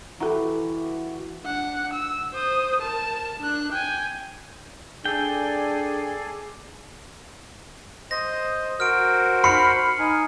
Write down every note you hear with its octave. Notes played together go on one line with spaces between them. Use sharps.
E3 E4 F#4 G4 A4 A#5
D4 F#5
E6
C5 D#6
A#4 A5
D4 F#6
G5 G#5
D4 G#4 A4 D5 G5 G#5
C5 D#5 A#6
F#4 A#4 C5 F6 D7
B5 F6 C7 C#7
D#4 G#5